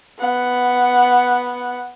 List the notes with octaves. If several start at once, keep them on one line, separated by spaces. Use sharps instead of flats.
B3 F#5